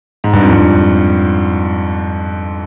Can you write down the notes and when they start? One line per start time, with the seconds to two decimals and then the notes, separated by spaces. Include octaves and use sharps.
0.24 G#2
0.33 G2
0.42 F2
0.52 G2